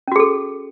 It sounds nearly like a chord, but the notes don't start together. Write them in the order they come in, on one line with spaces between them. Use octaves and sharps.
C#4 F#4 G#4 A4